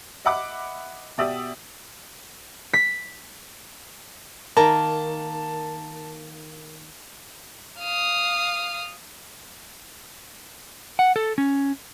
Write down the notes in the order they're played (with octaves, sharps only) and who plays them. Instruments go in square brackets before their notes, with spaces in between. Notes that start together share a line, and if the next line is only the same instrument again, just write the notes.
[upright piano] D#5 E5 F#5 B5 D6
B2 G4 D5 E5 D#6 E6
[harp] B6
[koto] D#3 A#3 [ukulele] A#4 [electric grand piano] A5
[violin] F5 D#6
[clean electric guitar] F#5
A4
C#4